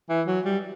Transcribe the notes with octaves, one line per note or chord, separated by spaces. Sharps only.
E3
F#3
G3